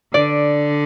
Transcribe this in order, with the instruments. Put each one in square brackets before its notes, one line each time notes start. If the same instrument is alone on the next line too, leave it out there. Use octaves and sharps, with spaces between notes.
[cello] D3 [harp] D5